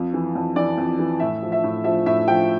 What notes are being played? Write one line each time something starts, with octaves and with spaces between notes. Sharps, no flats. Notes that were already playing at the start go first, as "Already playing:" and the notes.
Already playing: F2
E3
F2
E3 D5
F2
E3
A2 E5
F3
E5
A2
F3 E5
A2 E5
F3 G5